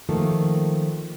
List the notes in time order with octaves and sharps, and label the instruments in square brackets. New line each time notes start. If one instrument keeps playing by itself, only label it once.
[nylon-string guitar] D#3 F3 A3 A#3 A4